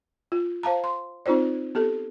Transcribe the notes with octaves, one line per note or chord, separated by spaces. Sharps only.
F4
C5 F5 A5 A#5
C6
C4 D#4 F4 C5 D5
B3 G4 A4